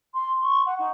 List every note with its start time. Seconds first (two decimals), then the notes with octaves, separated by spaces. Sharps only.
0.14 C6
0.42 C#6
0.66 F#5
0.79 D#4